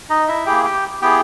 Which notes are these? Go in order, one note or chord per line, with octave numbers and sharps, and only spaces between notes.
D#4 D#5
E4 E5
A#3 E4 G4 G#4 G5
G4 G5
B3 E4 G4 G#4 G5